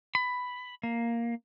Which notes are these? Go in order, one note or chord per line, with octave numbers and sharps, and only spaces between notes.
B5
A#3